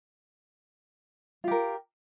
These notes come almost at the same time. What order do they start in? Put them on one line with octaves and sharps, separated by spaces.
F4 G4 A#4